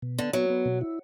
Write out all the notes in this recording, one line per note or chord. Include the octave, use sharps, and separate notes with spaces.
B2
D3 B3
F#3 B3
B3
B2
E4